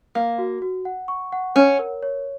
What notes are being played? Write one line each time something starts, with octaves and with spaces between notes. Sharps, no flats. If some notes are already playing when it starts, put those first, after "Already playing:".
A#3 F5
F#4
F#4
F#5
C#6
F#5
C#4 C#5
A#4
C#5